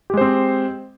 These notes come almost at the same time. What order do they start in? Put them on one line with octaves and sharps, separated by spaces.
G4 G#3 C5 C4